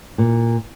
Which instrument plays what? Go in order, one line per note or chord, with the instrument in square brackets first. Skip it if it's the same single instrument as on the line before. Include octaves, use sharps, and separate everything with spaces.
[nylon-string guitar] A#2